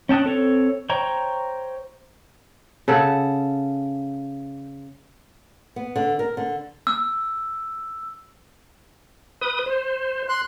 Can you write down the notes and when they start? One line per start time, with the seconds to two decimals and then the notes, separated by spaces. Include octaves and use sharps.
0.09 C#4 G5 A5 D#6 F#6
0.24 C4 A4 C#5
0.90 C5 C#5 G5 A#5
2.88 C#3 A4 F#5
5.76 B3
5.96 D3
6.19 A#4
6.37 D3
6.87 E6
9.41 B4 D#6
9.66 C5
10.29 C6 F#6